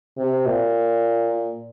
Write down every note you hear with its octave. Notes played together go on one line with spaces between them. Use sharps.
C3
A#2